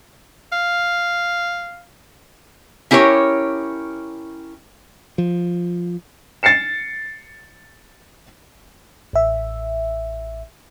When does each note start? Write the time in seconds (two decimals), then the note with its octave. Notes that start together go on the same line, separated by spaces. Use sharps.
0.52 F5
2.91 C#4 E4 G4 A#4 C#5
5.18 F3
6.43 A6 C7 C#7 E7
9.13 A1 E5